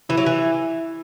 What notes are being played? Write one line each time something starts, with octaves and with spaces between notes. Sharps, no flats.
E3 E4
F#3
E3